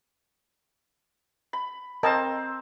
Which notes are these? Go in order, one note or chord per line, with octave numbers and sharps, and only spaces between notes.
B5
C4 A#4 C5 D#5 A5